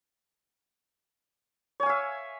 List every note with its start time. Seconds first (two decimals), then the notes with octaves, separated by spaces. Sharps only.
1.80 C#5
1.83 G#5
1.86 F5
1.89 E5